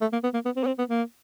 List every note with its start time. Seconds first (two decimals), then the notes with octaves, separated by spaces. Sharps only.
0.01 A3
0.13 A#3
0.23 B3
0.34 A#3
0.45 B3
0.56 C4
0.63 B3
0.67 C4
0.78 B3
0.89 A#3